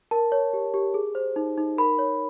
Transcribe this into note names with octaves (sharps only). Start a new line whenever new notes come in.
A#4 A5
C#5
G4
G4
G#4
C5
D#4
D#4
A#4 B5
C#5